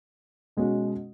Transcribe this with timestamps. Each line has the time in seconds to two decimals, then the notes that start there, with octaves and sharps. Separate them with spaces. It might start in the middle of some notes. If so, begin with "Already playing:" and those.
0.57 B2 G#3 C#4 F#4